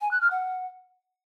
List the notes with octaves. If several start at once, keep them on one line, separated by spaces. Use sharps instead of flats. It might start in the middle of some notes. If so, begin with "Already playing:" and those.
G#5
F#6
F6
F#5